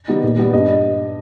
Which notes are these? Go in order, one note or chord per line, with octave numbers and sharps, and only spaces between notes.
D#3 G3 B3 D#4
A#2
G3 B3
G2 D#5